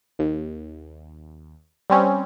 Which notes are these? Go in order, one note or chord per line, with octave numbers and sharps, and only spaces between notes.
D#2
G3 C4 C#4